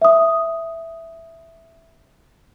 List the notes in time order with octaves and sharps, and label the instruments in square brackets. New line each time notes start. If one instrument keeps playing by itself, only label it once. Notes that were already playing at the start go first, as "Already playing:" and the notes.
[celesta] E5 D#6